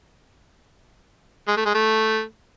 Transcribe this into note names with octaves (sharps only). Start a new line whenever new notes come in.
G#3
A3
G#3
A3